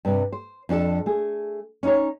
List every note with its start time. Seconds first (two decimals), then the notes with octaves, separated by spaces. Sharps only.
0.05 G2 C3
0.32 C5
0.69 F2 D4 F#4 A4
1.06 A3 G#4
1.83 C#4 D#4 C#5